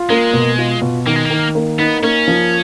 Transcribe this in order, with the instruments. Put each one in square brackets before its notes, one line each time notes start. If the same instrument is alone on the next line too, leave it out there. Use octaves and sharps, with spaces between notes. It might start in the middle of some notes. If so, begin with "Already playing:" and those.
Already playing: [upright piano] F4
[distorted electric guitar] G#3 [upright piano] A#3
[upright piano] B2
F4
B2
[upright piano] D#3 [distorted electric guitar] A#3
[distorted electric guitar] G#3
A#3
[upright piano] D#3
A#3
[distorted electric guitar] B3 [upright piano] D#4
[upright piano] A#3 [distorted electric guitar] C#4
[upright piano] F3